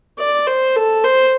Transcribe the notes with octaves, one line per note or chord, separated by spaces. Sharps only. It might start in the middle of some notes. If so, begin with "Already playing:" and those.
D5
C5
A4
C5